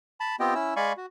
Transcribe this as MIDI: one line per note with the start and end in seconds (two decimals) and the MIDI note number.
0.20 0.36 81
0.20 0.36 83
0.40 0.54 59
0.40 0.54 60
0.40 0.54 65
0.40 0.54 67
0.40 0.54 75
0.40 0.54 79
0.54 0.74 61
0.54 0.74 64
0.54 0.74 88
0.76 0.93 56
0.76 0.93 74
0.76 0.93 77
0.76 0.93 80
0.76 0.93 83
0.76 0.93 85
0.97 1.06 66